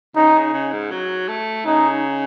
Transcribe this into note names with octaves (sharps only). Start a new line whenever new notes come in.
C#3 D#4
C#3
C#3
G#2
F#3
A3
C#3 D#4